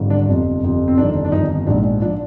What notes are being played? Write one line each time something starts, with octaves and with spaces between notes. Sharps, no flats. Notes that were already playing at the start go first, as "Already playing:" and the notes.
Already playing: G#1 G2 D3
D4
G1 F2 C3
G1 F2 C3
C4
G1 F2 D#3 D4
D4
G1 F2 D#3 D#4
A#1 G#2 F3 D4
F3 D4